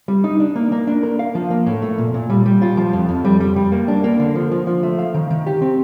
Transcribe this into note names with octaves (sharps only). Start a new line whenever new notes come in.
G3
D#4
D4
A#3
A#3
D4
A#4
F5
F3
A#3
A2
A3
A#2
A#2
G3
G3
F4
F3
F2
F2
G3
G3
G3
A#3
D4
A#3
D3
F3
F3
F3
A3
F5
D#3
D#3
G4
C4